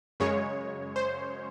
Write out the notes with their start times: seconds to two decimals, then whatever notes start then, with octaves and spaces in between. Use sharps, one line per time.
0.20 F#2 C#3 G#3 C#5
0.96 C5